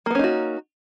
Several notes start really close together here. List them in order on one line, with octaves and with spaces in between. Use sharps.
A#3 B3 C#4 D#4 F#4